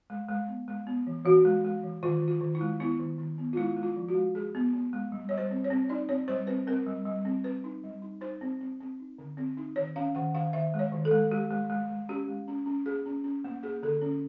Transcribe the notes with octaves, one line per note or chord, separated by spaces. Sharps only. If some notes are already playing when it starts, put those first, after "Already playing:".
G#3
G#3
B3
G#3
B3
E3
E3 F#4
G#3
G#3
E3
D#3 F4
D#3
F4
D#3
E4
G#3
B3 E4
D#3
D#3
B3
F4
G#3 E4
G#3
F4
F3
F#4
G#3
G#3 G#4
B3
B3
G#3
G3
G3 C#5
C5
C4
C#5
C4
D#4 D5
C4 C#5
G3 C5
C4 B4
C4 A#4
G3
G3
C4
C4 B4
D#4
G3
D#4
D#4 C5
C4
C4
C4
D#4
D3
C4
D#4
D#3 C#5
C#4 F5
D#3 F#5
D#3 F5
D#3 E5
G#3
C#5
D#3
A4
G#3
G#3 G4
G#3
G#3
G#3
C#4 G4
G#3
C#4
C#4
A#3 G#4
C#4
C#4
A#3
A#3 G#4
D3 A4
C#4